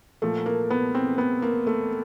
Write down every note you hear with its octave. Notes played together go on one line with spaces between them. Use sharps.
A#2 F3 A3
A#3
B3
C4
B3
A#3
A3